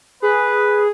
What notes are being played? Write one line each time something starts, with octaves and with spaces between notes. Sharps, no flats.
G#4 B4